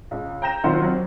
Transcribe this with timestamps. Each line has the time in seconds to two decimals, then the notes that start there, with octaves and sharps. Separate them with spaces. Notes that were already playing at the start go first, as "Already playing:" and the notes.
0.11 C#2
0.42 G5 A#5 G6 A#6 E7
0.64 B1 D#3 C4 F4 F#5 C6
0.82 F#3 C4